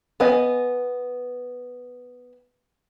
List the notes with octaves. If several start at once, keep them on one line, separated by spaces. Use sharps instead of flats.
B3 B4 D#5 G#5